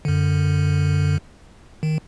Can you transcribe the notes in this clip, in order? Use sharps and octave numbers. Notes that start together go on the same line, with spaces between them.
F#2 D3
D#3